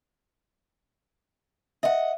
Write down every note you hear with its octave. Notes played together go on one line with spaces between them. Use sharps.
D#5 E5 F#5